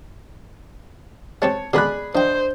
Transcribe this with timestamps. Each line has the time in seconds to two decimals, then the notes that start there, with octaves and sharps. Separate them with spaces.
1.42 G#3 C4 G4 C#5 A5
1.73 B2 D3 G#3 G#4 D5 B5 F#6
2.15 F3 D4 C5 D#5 G5